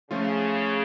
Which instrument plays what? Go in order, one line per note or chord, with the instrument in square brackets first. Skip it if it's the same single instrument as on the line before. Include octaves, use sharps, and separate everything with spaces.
[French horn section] C#3 [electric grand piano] F3 A3 C#4 F4